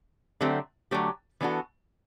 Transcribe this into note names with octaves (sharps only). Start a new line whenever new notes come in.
D3 F#3 A3 C4 G4
D3 F#3 A3 C4 G4
E3 B3 D4 F#4 A4